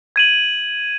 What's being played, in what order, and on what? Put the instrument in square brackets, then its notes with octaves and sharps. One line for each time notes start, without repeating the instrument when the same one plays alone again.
[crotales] G#6 D#7 F#7